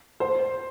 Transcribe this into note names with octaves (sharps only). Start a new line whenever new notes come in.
C5